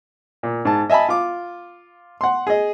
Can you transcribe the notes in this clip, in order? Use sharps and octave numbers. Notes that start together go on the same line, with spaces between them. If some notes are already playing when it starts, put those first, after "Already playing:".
A#2
G#2 A5
D#5 E5 G#5 A5 B5
F4 D6
F#5 C6
G#4 D#5